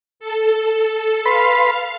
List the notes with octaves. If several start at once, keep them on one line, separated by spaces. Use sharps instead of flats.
A4
B4 F5 B5 C6